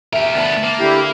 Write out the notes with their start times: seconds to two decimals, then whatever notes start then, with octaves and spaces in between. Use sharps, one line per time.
0.13 G4 A#4 E5
0.34 D2 B3 A5
0.63 A#3
0.80 D3 E4 G4